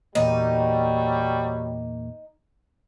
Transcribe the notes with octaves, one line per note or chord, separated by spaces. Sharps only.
E2 A#2 F#3 G3 A#3 D#4